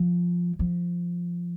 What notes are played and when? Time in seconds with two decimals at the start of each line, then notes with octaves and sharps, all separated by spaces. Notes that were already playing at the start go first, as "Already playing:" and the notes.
Already playing: F3
0.59 F3